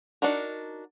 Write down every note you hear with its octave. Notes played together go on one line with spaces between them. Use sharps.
D4 D#4 F#4 A#4